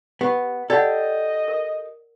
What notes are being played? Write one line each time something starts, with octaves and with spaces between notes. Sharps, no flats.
B3 G4
G4 A4 D5 D#5 F#5
A#4